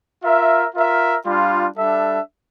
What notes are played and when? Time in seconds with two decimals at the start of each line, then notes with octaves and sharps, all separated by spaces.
0.23 F4 A#4 E5
0.75 F4 A#4 E5
1.26 G3 D4 F4
1.77 G3 D4 A4 E5